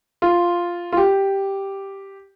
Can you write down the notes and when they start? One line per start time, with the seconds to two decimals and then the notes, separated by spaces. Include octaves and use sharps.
0.22 F4
0.92 F4
0.97 G4